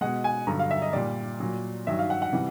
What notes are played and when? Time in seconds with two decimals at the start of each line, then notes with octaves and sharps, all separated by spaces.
0.01 B2 G#3 F#5
0.24 G#5
0.47 G2 D3 F#3 A#5
0.59 F5
0.71 E5
0.82 D#5
0.93 A#2 G3 D5
1.40 A#2 F#3
1.87 G2 D#3 F#3 E5
1.99 F5
2.10 F#5
2.22 F#5
2.33 C3 E3 G3